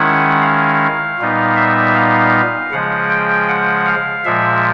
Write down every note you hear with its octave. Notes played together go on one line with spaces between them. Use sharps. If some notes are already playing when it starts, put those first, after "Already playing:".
Already playing: D#3 G#3 C#4 E4 F#5
F5
A#2 G3 B3 D#4
E5
F5
C#3 F3 G#3 F#5
G5
F#5
F5
A#2 F3 G#3 E5